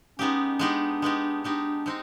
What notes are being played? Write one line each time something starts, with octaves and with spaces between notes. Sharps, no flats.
G#3 B3 C#4 D#4 G4
G#3 B3 D4 D#4 G4
G#3 B3 D#4 G4
G#3 B3 D4 D#4 G4
G#3 C4 D#4